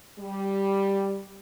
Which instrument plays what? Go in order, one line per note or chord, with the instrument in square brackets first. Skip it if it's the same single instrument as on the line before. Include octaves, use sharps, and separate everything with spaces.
[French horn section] G3